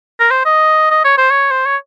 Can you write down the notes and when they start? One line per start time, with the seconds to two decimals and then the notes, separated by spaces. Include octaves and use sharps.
0.20 A#4
0.31 C5
0.45 D#5
0.90 D#5
1.04 C#5
1.18 C5
1.30 C#5
1.51 C5
1.65 C#5